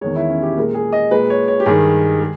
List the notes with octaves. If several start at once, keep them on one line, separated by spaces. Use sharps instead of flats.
E2 D#3 G#3 C#5
E4
C#4
G4
A#2 G#3 A#4
G#4
D#5
A#2 G#3 B4
C#5
C#5
G4
G2 D#3 G#3 G#4
G#3